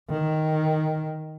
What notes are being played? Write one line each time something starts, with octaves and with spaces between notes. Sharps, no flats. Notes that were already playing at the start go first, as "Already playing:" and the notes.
D#3